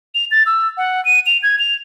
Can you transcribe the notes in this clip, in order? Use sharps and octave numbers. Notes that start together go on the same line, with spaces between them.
F7
A6
E6
F#5
D#7
F7
G#6
F7